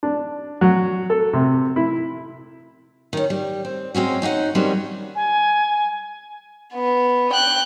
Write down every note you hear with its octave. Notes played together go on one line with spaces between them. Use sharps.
D4
F#3
A4
C3
E4
D#3 C#4
G3
C4
G#3 C4 C#4 F#4
C#4 D#4 G#4 F#5
D#3 F#3 G3 C4 C#4
G#5
B3
G5 F#6